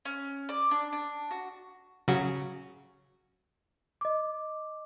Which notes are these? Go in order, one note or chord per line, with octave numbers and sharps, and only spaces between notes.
C#4
D5
D4
D4
F#4
C#3 F#3 F#4
D#5 D6